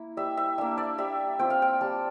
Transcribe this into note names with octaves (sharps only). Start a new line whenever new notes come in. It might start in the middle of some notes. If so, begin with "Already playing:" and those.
Already playing: A#3 E4
G3 E5
E5
A#3 D4 E5
D5
G3 E5
C4 F4 G5
F5
G5
G3 A5